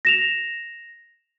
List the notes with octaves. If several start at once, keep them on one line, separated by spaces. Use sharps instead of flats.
A#6 E7 F7